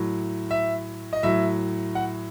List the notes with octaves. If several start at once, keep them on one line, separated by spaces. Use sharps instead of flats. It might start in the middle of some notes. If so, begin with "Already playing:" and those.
Already playing: A2 F#3
E5
D#5
A2 F#3 E5
F#5